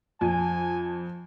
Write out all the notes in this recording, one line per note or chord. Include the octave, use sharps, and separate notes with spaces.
F2 G#5